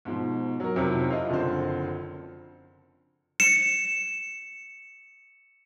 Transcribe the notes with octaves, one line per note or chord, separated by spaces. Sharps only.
G#2 B2 F3
F#3 A#4
F2 C3 D#3 F#3 C4 E4
E4 F4 D#5 F5
F#1 D3 F3 C4 C5
C#7 E7